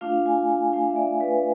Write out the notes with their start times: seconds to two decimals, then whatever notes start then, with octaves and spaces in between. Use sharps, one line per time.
0.01 A3 D4 F4 F5
0.26 G#5
0.49 G#5
0.73 A3 D4 F4 F5
0.90 E5
0.96 D5
1.20 B4